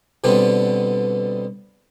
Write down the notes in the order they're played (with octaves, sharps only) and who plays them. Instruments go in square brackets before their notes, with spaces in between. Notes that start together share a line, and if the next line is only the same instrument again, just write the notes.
[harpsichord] B2 D3 G3 B3 C4